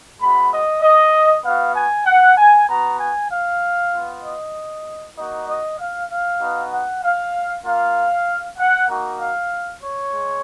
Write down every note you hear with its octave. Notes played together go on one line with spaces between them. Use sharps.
G#3 B3 F#4 B5
D#5
D#5
B3 F#4 F5
G#5
F#5
G#5
B3 F#4 A#5
G#5
F5
B3 F4
D#5
A#3 D#4 F#4 D#5
D#5
F5
F5
B3 D#4 F#4
F#5
F5
A#3 F4 F5
F#5
A#3 D#4 F#4
F5
C#5
G#3